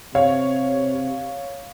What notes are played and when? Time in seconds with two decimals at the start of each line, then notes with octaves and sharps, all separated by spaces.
0.14 C3 C#5 F5